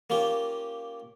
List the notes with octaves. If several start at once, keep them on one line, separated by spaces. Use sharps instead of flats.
A#3 C#4 F4 G4